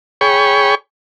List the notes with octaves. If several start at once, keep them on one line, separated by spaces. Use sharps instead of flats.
G#4 C#5 G5 B5 C#6